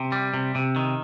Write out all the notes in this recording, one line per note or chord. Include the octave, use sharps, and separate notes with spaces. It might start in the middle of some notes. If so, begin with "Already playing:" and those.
Already playing: C3
G3
C3
C3
D#3